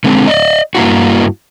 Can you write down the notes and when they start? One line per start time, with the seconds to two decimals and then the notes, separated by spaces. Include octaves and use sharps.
0.04 D3 G#3 C4
0.28 D5 D#5
0.75 G2 A#3 E4 F#4